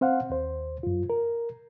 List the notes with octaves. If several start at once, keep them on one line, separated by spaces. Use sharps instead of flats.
C4 C5 F5 F#5
D#2 C5
F#2 F4
A#4